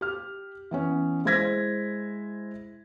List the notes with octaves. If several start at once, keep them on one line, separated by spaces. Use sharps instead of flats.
G4 F6
E3 B3 C#4
G#3 E4 C5 G#6 A#6 B6